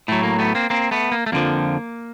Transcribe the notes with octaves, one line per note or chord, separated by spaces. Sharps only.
A2 F#3 A3
A#3
A3 B3
A#3 C4
A#3 C4
A3 B3
A#3
A3
F2 D3 F3 A#3